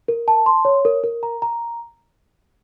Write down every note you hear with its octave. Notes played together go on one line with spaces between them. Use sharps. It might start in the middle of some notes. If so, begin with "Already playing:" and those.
A#4
A5
C6
C#5
A#4
A#4
A#5
A#5